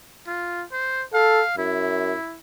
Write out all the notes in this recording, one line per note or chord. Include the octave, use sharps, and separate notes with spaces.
F4
C5
A4 F5
F#2 E4